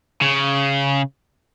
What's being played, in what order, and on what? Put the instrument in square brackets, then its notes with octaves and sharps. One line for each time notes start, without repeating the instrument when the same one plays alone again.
[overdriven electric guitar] C#3